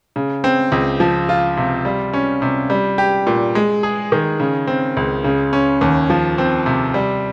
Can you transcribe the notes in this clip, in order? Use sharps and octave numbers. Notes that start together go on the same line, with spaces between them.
C#3
C4
C#2
F3
F4
C3
G3
C#4
C3
G3
G4
A#2
G#3
G#4
D#3
C#3
C4
C#2
C#3
C#4
D#2
F3
C4
C3
G3